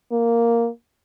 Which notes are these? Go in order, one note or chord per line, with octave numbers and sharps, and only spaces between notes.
A#3